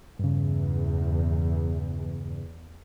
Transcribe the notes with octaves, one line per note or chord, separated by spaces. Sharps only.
E2 G2 C#3